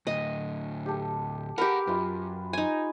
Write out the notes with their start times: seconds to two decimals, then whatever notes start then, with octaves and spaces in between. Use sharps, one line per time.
0.07 D2 A2 D#5
0.86 G4 A4
1.58 G4 G#4 A#4 B4 F#5 A#5
1.87 F#2 F4 B4
2.53 D#4 G#5